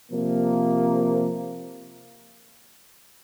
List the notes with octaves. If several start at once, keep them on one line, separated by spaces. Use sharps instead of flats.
C3 F3 A#3